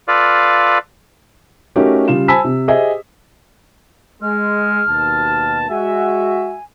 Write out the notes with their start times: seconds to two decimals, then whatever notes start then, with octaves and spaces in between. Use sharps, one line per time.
0.08 F4 A4 B4 D5 F5
1.76 A3 C#4 D#4 F#4 G4 A#4
2.08 C#3 G3 F4 E7
2.28 C5 G#5 A5 B5 E6 B6
2.44 C3
2.68 G4 G#4 C5 D#5 E5
4.22 G#3 F6
4.89 D#2 B2 A5
5.69 G#3 F#4 E5 G#5